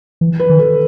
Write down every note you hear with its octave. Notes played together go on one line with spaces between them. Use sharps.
E3
B4
D#3
A4